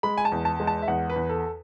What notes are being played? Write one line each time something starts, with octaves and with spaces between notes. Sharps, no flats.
G#3 B5
G#5
A5
E2
A5
G#3
A5
E5
E2 F#5
B4
E2
A4